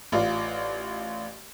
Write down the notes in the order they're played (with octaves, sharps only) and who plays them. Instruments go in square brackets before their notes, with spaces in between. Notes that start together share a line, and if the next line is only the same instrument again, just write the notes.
[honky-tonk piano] A1 F4 D5